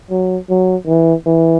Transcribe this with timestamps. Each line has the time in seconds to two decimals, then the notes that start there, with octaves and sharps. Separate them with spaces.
0.10 F#3
0.50 F#3
0.87 E3
1.27 E3